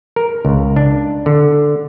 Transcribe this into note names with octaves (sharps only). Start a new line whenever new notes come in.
A#4
C#2
D4
D3